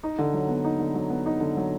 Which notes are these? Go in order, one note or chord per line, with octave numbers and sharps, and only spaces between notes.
D#4
D3
F#3
B3
D#4
D3
F#3
B3
D#4
D3
F#3